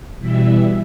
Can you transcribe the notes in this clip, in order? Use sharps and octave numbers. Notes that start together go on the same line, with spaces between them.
B2 E3 G3 E5